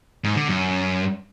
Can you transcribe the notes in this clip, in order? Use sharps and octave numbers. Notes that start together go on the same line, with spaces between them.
G#2
D3
F#2